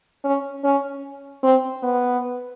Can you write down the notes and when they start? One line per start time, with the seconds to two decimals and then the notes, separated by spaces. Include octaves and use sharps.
0.24 C#4
0.64 C#4
1.43 C4
1.83 B3